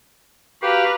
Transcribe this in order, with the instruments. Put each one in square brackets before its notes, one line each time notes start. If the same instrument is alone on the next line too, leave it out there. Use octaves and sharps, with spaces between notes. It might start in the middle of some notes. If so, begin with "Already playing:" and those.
[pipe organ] F#4 F5 [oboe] G4 [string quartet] B4 A#5 F6